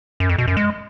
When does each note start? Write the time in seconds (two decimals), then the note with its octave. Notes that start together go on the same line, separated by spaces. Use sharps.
0.20 F#2
0.29 F2
0.38 B2
0.48 F#2
0.57 G#3